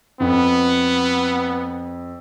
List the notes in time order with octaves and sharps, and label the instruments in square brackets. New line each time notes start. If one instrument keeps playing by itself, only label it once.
[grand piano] F2 [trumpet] B3